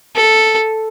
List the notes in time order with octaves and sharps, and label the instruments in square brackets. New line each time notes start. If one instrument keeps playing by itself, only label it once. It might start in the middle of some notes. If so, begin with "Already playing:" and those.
[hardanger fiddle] A4